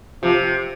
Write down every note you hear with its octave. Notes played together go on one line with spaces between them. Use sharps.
C3 F3